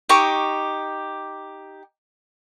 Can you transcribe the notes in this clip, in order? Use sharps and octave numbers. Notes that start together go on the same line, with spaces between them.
D#4 G4 C#6 D6